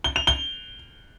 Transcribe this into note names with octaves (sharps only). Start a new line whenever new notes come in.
G7
F7
G7